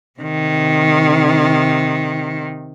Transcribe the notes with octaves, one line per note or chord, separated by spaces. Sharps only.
C3 D#3